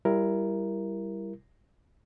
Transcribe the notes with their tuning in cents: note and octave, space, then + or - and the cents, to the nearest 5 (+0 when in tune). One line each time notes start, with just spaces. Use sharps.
G3 +0 E4 +20 A#4 +5